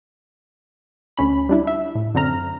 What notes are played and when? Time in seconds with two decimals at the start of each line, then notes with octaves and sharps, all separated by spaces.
1.17 D2 C#4 B5
1.49 G3 D4 E4
1.67 E5
1.95 A2
2.14 F#2 D3 C4 A#5 F6